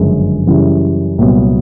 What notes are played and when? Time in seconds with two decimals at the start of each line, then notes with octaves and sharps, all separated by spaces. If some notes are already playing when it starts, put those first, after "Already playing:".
Already playing: G1 F#2 C#3 F3 G#3
0.47 F#2 C#3 E3 G3
1.18 C2 A#2 F#3 B3